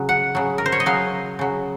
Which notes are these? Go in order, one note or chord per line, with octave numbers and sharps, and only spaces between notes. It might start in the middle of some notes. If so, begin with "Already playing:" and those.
Already playing: C#3 F#3
F#5
C#3 F#3
A#4
C5
C#5
D#5
C#3 F#3 F5
C#3 F#3